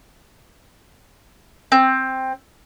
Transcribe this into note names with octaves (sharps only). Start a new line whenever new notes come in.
C4